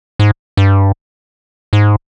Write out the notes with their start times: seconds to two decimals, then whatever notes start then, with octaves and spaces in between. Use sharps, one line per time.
0.19 G#2
0.57 G2
1.73 G#2